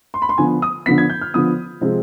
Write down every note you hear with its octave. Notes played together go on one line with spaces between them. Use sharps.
C6
B5
C6
D3 F3 B3 G#5
D#6
D3 F3 B3 B6
G#6
G6
F6
D3 F3 B3 D#6
C3 F3 G#3 C4